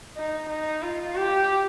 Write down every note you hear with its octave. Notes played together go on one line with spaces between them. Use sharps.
D#4
D#4
F4
G4